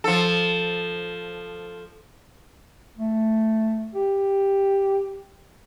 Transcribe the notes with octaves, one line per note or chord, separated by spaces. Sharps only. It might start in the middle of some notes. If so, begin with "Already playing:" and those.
F3 A4
A3
G4